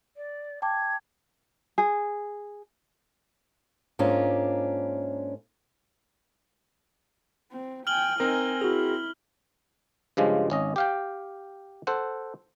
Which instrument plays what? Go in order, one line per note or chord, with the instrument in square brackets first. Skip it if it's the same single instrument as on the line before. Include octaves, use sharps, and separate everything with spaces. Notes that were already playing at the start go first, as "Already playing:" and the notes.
[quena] D5
[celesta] G5 A5 D6 [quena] G#6
[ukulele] G#4
[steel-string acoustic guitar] G#2 A#3 C#4 D4 F4
[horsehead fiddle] C4
[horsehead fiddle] G5 G#5 [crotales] F6 F#7 G7
[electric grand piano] C4 A#4 [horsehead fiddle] D#4 G#5
[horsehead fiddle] E4 [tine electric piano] F#4 G#4
[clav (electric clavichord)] G2 C#3 F3 G#3
G#1 C#4 D#5
G4 F5 G5
A4 C5 F#5